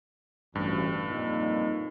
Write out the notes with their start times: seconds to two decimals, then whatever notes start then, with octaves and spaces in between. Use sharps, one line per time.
0.55 A1 D2 G2
1.09 F2 A#2 D#4